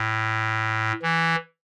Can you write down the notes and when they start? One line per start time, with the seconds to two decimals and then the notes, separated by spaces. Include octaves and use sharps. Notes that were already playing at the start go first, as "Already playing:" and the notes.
Already playing: A2
1.02 E3